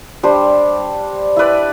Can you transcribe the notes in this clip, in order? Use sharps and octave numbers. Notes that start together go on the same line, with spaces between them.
G3 D4 G4 C5
E4 B4 D5